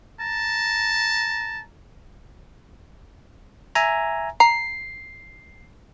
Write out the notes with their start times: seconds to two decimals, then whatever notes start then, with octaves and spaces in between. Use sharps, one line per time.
0.20 A5 A#5
3.75 E5 G#5 A#5
4.40 A#5 C7